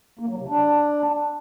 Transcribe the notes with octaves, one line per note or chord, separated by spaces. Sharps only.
A#3
F#3
C3
D4